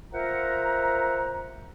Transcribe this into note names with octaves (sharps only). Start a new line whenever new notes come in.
F4 A#4 C5 E5 F#5 A#5